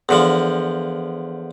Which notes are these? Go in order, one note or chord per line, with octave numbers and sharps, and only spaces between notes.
E2 D3 F3